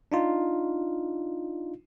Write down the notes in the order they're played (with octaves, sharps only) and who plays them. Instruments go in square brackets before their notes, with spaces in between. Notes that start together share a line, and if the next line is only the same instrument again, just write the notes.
[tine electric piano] D4 D#4 F4